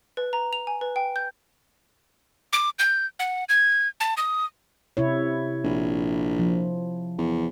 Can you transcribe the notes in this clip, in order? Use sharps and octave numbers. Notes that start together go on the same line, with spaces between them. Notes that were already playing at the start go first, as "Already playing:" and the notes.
B4
A#5
F7
G#5
B4
G5
G6
D6
G6
F#5
G#6
A5
D#6
C3 E4 C#5
A#1
F3
E2